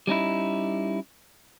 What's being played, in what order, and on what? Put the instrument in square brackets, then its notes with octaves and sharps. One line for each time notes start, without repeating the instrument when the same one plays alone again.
[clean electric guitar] G3 C#4 D#4 E4